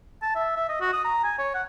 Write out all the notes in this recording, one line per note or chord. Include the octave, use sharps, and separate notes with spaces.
A5
E5
E5
D#5
F#4
D#6
A#5
G#5
C#5
F#5